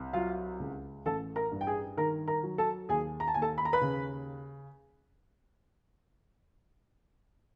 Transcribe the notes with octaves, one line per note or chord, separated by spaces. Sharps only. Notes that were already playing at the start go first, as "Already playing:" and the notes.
Already playing: C2
F#3 F4 F5
C#2
A1 A4 A5
A#4 A#5
G2
G5
G#4 G#5
D#3 A#4 A#5
A#4 A#5
F#3
A4 A5
D#2 G#4 G#5
A#5
A5
D#2 G#5
A4 A5
B5
A#5
B4 B5
C#3